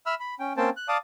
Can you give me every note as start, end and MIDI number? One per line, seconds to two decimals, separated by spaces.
0.06 0.15 76
0.06 0.15 83
0.06 0.15 88
0.06 0.15 89
0.20 0.34 83
0.39 0.53 61
0.39 0.53 79
0.57 0.70 58
0.57 0.70 60
0.57 0.70 61
0.57 0.70 72
0.57 0.70 79
0.57 0.70 81
0.77 0.88 90
0.88 0.97 74
0.88 0.97 77
0.88 0.97 81
0.88 0.97 86
0.88 0.97 87